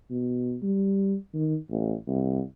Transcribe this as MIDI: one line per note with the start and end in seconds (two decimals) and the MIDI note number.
0.10 0.57 47
0.62 1.16 55
1.34 1.56 51
1.70 1.95 33
2.07 2.42 36